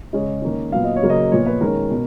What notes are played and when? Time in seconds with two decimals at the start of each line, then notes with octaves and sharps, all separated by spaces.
0.13 C#3 G#3 C#4 D#5
0.42 D#3 A#3 C#4
0.72 A#2 F#3 B3 F5
0.84 D#5
0.96 C#5
1.02 C#3 F#3 A#3
1.10 D#5
1.31 A#2 F3 B3 C#5
1.46 B4
1.61 D#3 G#3 C#4 A#4
1.90 B2